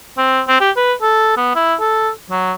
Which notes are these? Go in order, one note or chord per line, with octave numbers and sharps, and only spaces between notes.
C4
C4
G4
B4
A4
B3
E4
A4
F#3